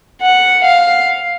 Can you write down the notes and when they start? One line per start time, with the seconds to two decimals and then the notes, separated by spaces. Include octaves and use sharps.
0.21 F#5
0.64 F5